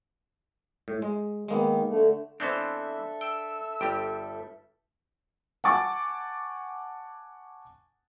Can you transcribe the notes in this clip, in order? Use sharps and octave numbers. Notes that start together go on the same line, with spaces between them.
A2
G#3
D#3 G#3 A#3 B3
D3 A3
E3 B3 C4 D4 A4 C5 E5
G5 E6
G1 G3 G4 G5
F#5 G#5 A5 C#6 D6 A6